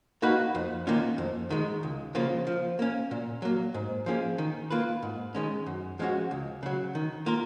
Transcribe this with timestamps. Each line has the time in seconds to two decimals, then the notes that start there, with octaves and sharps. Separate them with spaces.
0.22 A#3 D#4 F#4 B4
0.55 F2
0.87 D#3 A#3 C#4 F4
1.18 F2
1.50 D#3 G#3
1.83 C#2
2.15 C#3 F3 A#3 F4
2.47 F3
2.79 A#3 C#4
3.11 A#2
3.42 F#3 A#3
3.74 G#2
4.06 F3 A#3 C#4 G#4
4.38 D#3
4.71 A#3 F4 B4
5.03 G#2
5.35 D#3 G#3 C#4
5.66 F#2
5.99 F3 G#3 C#4 F#4
6.31 C#2
6.63 C#3 F#3
6.95 D#3
7.26 A#3 F4 A#4